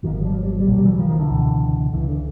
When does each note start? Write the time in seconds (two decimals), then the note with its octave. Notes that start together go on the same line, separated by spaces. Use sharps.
0.03 G#2 D#3 F3
0.06 G#1
0.14 D#3 F3
0.20 F#3
0.24 F3 G3
0.35 F#3
0.43 G3
0.52 F#3
0.60 G3
0.67 B1 A#2 F#3
0.77 G3
0.85 E3 F#3
0.98 D#3 F3
1.09 D#3 F3
1.19 D3 E3
1.30 C#2 B2
1.92 C#2 D3 E3
1.97 C#3
2.09 D3